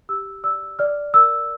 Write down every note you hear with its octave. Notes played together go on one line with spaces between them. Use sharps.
G4 E6
D5 E6
D5 F6
A#4 E6